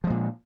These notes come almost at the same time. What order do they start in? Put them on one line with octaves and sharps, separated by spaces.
F3 G#3 A#2